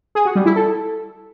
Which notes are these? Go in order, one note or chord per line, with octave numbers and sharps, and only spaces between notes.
G#4
F#4
G3
E4
A4